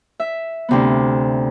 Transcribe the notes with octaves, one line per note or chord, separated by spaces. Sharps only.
E5
D2 C3 B3